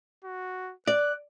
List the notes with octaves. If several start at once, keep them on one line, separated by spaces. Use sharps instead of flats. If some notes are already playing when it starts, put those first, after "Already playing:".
F#4
D5 F#6